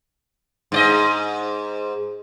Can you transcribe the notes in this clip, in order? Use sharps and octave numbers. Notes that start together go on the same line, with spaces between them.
G#2 D5 D#5